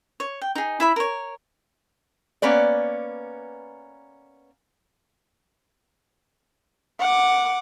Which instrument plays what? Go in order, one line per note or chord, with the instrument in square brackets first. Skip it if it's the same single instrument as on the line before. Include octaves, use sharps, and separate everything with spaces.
[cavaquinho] C#5
G5
D#4 G#4
E4 E5 B5
A#4 C#5
[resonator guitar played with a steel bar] A#3 B3 C#4 B4 D5
[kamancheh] F#5 D6